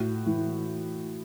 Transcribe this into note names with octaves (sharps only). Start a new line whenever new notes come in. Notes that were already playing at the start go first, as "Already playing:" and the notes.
Already playing: A2 F#4
E3